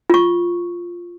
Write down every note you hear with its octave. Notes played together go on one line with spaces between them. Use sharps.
F4 C#6